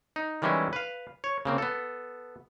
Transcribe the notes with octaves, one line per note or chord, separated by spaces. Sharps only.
D#4
D#3 E3 G3 G#3 C#4 E4
B4 F5
C#5
C#3 A#3 C4
B3 A4